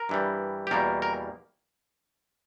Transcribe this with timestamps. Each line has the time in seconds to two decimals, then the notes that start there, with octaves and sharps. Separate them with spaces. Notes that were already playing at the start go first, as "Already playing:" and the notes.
Already playing: A#4
0.09 G2 E3 G3
0.67 G4
0.71 E2 B2 G3 A#3 A#4
1.02 A#4